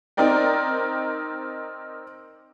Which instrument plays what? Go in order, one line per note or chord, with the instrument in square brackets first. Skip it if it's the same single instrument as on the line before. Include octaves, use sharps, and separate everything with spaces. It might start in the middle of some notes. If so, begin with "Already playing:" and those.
[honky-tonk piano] C4 D#4 A#4 D5 G5